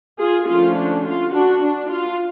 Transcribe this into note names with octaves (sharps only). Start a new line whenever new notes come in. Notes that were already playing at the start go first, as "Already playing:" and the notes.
F4 G#4
D3 F3 A3 C#4 F4
D4
F4
D4 F#4
D4
F4